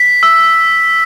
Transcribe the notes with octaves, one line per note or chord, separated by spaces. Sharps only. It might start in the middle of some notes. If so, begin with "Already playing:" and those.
Already playing: B6
E6